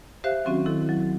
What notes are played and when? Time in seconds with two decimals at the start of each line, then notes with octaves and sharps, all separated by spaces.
0.24 G4 C5 E5 F5 F#6
0.45 D#3 F#3 C4 C#4 F#4
0.66 D#3 E4 A4
0.89 F#3